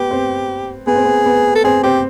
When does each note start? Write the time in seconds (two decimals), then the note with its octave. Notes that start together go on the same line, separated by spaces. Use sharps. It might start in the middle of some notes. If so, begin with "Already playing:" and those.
Already playing: B3 G4
0.11 C4
0.87 B3 G#4
0.95 C4
1.04 B3
1.26 B3
1.55 A4
1.64 C4 G#4
1.83 C4 G4